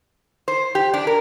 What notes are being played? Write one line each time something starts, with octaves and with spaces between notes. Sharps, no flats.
C5
G4
D4
A#4